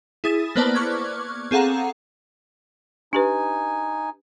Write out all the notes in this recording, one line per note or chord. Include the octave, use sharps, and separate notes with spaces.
E4 G#4 D#6 A6
A#3 B3 B4 C5 D5 A5
C#6 D6 F6 F#6 G#6
C4 G#4 A4 F5 F#5 A#5
D4 D#4 G4 B4 G#5